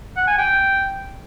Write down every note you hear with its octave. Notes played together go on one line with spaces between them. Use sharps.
F#5
G#5
G5